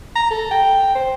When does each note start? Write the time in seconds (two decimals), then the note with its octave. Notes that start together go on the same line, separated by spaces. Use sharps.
0.15 A#5
0.31 A4
0.51 G5
0.95 C5